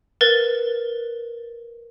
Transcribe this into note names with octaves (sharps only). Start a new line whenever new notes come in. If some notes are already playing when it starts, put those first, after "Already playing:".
A#4 B4 A6